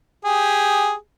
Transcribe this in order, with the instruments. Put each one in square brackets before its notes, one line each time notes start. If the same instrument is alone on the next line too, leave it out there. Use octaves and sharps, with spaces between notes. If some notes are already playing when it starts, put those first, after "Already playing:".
[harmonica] G4 G#4